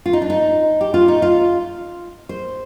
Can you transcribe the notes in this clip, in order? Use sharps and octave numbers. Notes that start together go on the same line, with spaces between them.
F4
D#4
D4
D#4
G4
F4
D#4
F4
C5